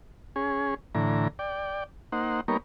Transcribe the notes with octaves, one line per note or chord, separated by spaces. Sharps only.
C#4 G#4
A2 D3 E3 A#5
D5 G5
A#3 D#4 C5 F#5
G3 A#3 B3 D#4 A#4 C#5